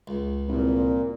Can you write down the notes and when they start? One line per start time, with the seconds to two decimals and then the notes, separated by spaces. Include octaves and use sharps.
0.07 C#2
0.48 C2 A#2